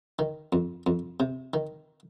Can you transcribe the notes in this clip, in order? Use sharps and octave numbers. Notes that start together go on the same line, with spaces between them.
D#3
F2
F2
C3
D#3